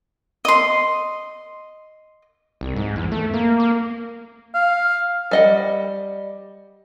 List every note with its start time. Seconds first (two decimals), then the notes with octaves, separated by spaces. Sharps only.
0.45 D#5 C6
2.61 C2
2.77 G#2
2.96 E2
3.12 A3
3.34 A#3
3.60 A#3
4.55 F5
5.31 G3 D#5 F#5